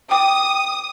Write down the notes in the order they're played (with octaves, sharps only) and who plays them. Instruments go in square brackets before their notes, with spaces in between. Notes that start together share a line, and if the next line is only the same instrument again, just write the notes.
[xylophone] G5 D6 [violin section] D#6